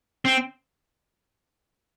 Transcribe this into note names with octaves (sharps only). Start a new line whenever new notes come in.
C4